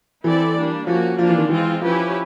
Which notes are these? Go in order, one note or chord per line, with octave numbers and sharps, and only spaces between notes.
E3 C4 E4 A4 D5
G3 A#3 D4
F3 A#3 C#4 F#4
F3 A#3 D4 F4
E3
D#3
E3 G#3 C4 F4
F3 C#4 E4 G4 B4